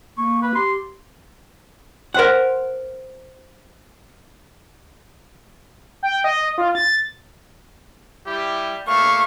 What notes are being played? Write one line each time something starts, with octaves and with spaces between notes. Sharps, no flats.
A#3 C#6
B4
G4 C6
A#4 C5 F#5
G5
D#5
F4
A6
G3 E4 G4
A3 A#3 F5 C#6